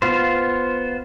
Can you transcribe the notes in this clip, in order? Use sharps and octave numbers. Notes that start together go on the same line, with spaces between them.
B3 F4 C5